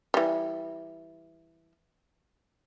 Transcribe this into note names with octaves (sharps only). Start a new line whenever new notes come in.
E3 G3